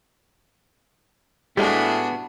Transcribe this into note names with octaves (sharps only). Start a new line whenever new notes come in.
A2 G3 G#3 B3 D4 F#4 G#4